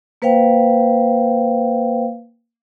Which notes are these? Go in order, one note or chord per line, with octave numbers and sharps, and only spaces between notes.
A#3 B4 C5 F5 G5